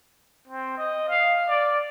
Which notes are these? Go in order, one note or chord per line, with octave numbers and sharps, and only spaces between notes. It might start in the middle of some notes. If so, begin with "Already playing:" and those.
C4
D#5
F5
D5